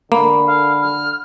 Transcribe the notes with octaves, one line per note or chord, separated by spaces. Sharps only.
D3 A#3 B5
F5
F6